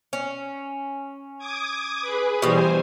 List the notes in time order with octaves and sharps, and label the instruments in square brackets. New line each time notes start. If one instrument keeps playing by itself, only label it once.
[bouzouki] C#4
[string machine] D6 D#6 G#6
G#4 B4
[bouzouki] B2 G3 [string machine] E3 C5 G#5